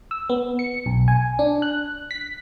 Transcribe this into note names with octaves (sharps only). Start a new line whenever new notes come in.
E6
B3
C#7
B1
G#5
D4
F#6
B6